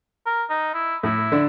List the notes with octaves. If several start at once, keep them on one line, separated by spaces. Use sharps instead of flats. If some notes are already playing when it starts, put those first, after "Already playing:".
A#4
D#4
E4
A2 E4
D3 D4